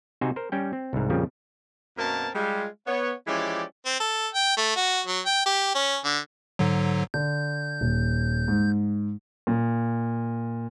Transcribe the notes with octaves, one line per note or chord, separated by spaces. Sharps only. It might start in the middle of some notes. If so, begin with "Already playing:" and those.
C3 D#4 F#4 C5 G#5
A#4 C5
G3 C#4 G5
C4
C2 G#2
F2 A#2 C#3 F3 G3
F#2 B2 A#3 C4 A#4 A5
G3 G#3 F4
B3 C#5
E3 F3 G#3 C#4 G4 D5
C4
A4
G5
A3
F#4
F#3
G5
G4
C#4
D3
G#2 D3 F#3
D3 G6
D#1
G#2
A#2